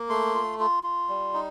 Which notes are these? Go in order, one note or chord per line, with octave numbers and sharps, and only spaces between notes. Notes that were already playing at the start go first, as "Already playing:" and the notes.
Already playing: A#3
A3 C6
F4
F4
F4
G3
D#4